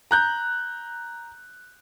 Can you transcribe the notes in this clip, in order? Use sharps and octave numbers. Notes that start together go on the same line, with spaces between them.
A#5 F#6 G6